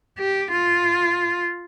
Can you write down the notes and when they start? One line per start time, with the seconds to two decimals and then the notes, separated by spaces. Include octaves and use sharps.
0.19 G4
0.52 F4